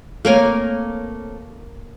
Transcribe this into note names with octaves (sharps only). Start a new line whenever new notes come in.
A3 A#3 C4 A#4 C#5 G#5